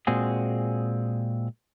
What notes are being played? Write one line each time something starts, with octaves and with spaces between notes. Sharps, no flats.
A#2 G#3 C4 F#4 G#4